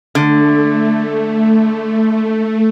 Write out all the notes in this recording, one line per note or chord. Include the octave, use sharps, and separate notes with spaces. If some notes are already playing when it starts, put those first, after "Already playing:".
D3 A3